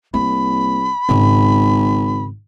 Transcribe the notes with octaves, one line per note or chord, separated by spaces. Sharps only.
C2 A#3 B5
G#1 G#2 C#3